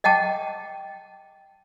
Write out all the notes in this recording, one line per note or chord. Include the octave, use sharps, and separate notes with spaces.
D#5 F#5 G5 A5 D6